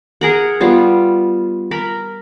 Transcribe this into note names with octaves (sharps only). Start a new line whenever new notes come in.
G#4 A#4 F#5
G3 B3 F4
A#4 B5